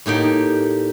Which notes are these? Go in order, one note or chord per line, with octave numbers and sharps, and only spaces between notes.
A2 A#3 D#4 G4